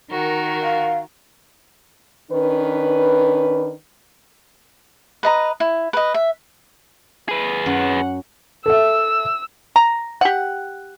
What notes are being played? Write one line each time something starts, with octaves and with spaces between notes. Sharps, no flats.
D#3 F#4 A#4
F5
D#3 C#4 D4 B4
B4 D#5 A#5
E4
B4 D#5
E5
G#4 B4
F#2 F#5
A4 E5 E6
A#5
G4 F#5